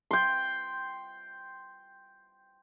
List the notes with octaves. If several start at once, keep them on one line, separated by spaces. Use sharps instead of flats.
G5 C6